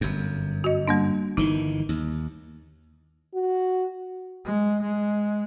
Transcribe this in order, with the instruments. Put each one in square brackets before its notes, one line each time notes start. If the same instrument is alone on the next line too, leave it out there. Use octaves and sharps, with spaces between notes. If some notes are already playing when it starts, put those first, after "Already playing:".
[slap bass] G1 F#2
[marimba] F#4 D#5
G3 A#3 D4
[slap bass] G1 D#3 E3 [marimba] D#4
[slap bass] D#2
[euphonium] F#4
[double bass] G#3
G#3